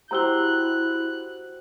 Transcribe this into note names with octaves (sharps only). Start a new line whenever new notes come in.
E4 F#4 G4 C5 A#5 E6 F#6 G7